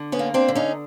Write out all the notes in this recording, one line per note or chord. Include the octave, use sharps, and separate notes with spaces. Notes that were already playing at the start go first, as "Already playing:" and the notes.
Already playing: D3
B3 C#4
A#3
C4 D4
D3
C#4 D#4